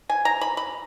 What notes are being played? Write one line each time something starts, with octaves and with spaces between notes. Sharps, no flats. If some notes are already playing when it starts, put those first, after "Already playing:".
G#5
A#5
B5
B5